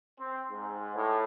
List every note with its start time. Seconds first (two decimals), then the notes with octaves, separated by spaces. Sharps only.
0.18 C4
0.50 G#2
0.95 A2